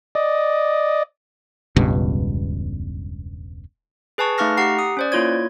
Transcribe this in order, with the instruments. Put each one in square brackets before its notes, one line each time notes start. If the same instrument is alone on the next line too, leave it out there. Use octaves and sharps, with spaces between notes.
[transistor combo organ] D5 D#5
[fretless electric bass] E1 C#2 G2 B2
[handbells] G#4 B4 G#5 A5 C#6
A3 D#4 F5 C#6 F6 A#6
G4 F#5 A#5 C7
D#6
C#4 C5 D5
A#3 E4 F4 C#5 G#6